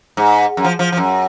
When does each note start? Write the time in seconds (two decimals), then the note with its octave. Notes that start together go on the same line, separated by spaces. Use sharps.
0.17 G#2
0.57 F#2
0.64 F3
0.79 F3
0.92 F3
0.97 F#2